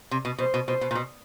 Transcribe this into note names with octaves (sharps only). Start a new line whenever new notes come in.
C3
B2
B2 C5
B2
B2 C5
B2
A#2
B2